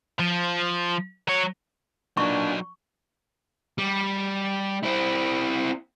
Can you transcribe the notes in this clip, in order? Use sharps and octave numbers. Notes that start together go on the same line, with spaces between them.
F3
F#3 C#5
A#2 F#3 D4 D#4 C#6
G3
C4 E4